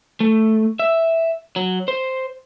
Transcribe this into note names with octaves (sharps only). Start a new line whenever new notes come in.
A3
E5
F#3
C5